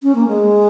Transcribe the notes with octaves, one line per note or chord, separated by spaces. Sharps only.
C#4
A#3
G#3